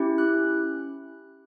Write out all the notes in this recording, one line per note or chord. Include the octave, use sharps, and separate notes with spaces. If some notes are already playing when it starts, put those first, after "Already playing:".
Already playing: C#4 E4 G4
F#6